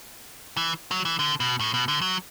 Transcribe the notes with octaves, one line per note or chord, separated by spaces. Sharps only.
E3
F#3
E3
D3
B2
A2
B2
D3
F#3